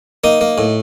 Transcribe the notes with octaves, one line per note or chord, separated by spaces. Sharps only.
A#3 D#4
A#3
A2